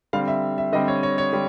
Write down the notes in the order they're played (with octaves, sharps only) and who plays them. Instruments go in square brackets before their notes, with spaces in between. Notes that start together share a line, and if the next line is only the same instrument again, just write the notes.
[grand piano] D3 G3 C4 F5
E5
E5
D3 G3 C4 D#5
C#5
C#5
C#5
D3 G3